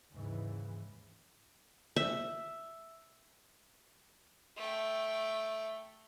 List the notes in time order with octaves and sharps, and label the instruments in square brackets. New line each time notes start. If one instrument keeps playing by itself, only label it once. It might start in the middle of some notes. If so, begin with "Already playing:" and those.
[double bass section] D#2 G#2 C#3 E3
[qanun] E5
[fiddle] A3 G5